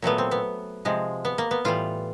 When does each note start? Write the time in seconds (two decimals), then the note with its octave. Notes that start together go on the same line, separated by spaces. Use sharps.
0.02 A#2 F#3 A3 B3
0.18 C4
0.31 B3
0.85 C3 F3 G#3
1.25 B3
1.38 A#3
1.51 B3
1.65 A2 E3 G3 F4